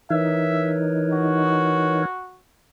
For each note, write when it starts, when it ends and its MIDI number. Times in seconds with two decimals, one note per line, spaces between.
0.10 2.05 52
0.10 2.05 63
0.10 2.02 70
0.10 2.02 71
0.10 2.02 73
0.10 0.75 76
1.13 2.40 66